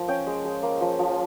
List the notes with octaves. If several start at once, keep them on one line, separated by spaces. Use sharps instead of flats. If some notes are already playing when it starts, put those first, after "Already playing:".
Already playing: F3 A#3
C#4 G5
G#3
G#3
A#3
F3
F3